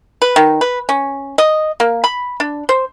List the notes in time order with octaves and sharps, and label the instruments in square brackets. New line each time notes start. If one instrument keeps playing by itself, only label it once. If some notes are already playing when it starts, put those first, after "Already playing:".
[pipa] B4
D#3
B4
C#4
D#5
A#3
B5
D4
C5